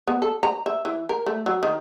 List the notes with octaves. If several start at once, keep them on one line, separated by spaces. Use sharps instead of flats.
B3
A4
A#5
E5
E3
A#4
A3
F#3
D#3